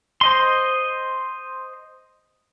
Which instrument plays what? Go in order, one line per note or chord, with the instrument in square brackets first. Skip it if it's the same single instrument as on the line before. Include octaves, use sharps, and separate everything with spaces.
[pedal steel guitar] C5 D#5 C6